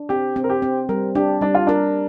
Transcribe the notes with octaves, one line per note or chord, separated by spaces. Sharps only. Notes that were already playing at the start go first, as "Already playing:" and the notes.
Already playing: D4
C4 G4
C4
A#4
G4
C4
G3 A#4
D4 G4
G3 D4
F4
D4 A#4